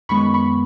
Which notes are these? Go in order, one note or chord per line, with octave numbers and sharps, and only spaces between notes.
F#2 D#3 G#3 B3 B5 C#6
B5 C#6